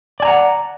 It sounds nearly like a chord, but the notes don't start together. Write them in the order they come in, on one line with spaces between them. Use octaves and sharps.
D5 G#5 A#5 F#5